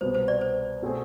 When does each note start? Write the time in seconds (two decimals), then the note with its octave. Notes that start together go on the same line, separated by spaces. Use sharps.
0.01 C2 B2 B3 C5
0.14 C5
0.28 D5
0.41 C5
0.82 B2 A3 C4 G#4